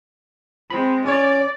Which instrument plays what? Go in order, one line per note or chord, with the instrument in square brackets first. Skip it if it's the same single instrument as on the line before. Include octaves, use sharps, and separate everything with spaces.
[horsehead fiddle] G#3 C4 [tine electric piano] B5
[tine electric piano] C#4 C#5 [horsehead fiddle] D5